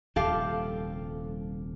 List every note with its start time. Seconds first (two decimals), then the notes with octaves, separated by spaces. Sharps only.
0.16 D#1 C2 F3 G4 A4 F5